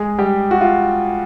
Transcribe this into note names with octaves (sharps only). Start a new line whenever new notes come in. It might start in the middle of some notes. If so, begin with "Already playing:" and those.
Already playing: G#3 G#4
G3 G4
F#4
F4